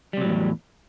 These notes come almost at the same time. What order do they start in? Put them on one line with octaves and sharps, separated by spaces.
G3 C3 F#3 A2 E2